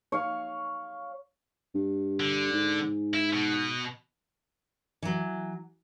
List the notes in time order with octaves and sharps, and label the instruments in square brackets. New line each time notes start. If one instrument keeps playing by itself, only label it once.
[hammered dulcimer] C#5 F5
[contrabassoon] G2
[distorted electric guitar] D3
[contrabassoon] G#2
[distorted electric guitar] E4
B2
[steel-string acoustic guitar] E3 F#3